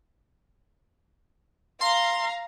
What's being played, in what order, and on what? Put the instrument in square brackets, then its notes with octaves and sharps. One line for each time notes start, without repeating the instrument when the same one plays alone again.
[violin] F5 A#5 [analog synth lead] C6